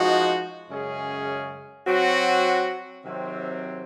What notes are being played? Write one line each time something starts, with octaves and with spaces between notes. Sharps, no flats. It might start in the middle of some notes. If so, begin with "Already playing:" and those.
Already playing: F3 G#3 D#4 F#4
F#2 C#3 G#3 C#4 G#4
F#3 C4 F#4
C3 D#3 F#3 C4